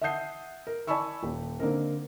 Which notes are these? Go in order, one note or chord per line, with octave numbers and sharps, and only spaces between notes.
E5 F#5 A5 D#6 G6 C7
A#4
D5 G#5 A5 B5 C#6 E6
D#1
D3 A#3 C4 D#4 A#4